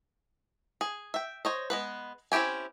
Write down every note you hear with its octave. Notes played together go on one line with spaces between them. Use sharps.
G#4
E5 G5
C5 C#5 D#5
G#3 B3 B4
C4 C#4 E4 G4 G#5